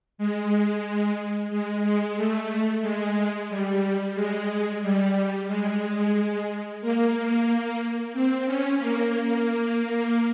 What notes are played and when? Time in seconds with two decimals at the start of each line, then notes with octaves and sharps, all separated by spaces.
0.18 G#3
1.50 G#3
1.83 G#3
2.17 A3
2.82 G#3
3.50 G3
4.15 G#3
4.82 G3
5.48 G#3
6.81 A#3
8.13 C4
8.46 C#4
8.79 A#3